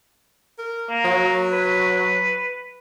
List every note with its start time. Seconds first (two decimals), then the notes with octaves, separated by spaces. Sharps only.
0.59 A#4
0.89 A#3
1.05 F#3
1.52 B4